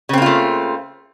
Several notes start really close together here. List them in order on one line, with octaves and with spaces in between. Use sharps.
C#3 C4 A#3 F4 A3